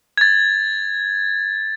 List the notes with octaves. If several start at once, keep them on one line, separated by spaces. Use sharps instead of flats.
G#6 A6